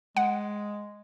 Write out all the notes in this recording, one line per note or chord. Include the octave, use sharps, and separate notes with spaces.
G#3 F#5